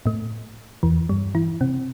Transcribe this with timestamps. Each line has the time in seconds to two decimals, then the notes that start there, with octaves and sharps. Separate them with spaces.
0.06 A2 A3
0.83 E2 E3
1.09 G2 G3
1.35 E3 E4
1.61 C3 C4